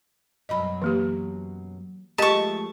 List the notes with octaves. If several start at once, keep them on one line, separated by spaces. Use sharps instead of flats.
F#2 B2 F#3 D#5 B5
E3 A#3 G4
F3 G#3 A3 G4 D#5 A5 C#6